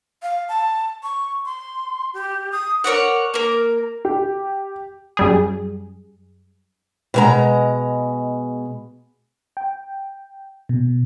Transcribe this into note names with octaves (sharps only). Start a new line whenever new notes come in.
F5
A5
C#6
C6
G4
D#6
A#4 C#5 D5 F#5
A#3 A#4
G4
F#2 G3 G#4
B2 G#3 A#5
G5
B2